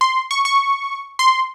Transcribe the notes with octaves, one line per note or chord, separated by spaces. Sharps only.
C6
C#6
C#6
C6